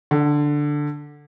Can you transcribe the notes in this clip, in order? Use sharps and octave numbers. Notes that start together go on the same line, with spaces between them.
D3